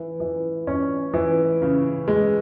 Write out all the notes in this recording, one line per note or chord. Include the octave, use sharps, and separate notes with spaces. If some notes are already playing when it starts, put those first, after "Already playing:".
Already playing: E3
E3
C#4
E3
C#3
G#3